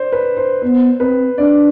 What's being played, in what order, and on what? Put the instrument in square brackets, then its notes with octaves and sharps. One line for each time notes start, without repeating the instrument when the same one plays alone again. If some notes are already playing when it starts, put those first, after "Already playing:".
Already playing: [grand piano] C5 D5
B4
C5
[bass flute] B3 [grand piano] C5
[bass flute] C4 [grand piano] B4
[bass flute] D4 [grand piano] D5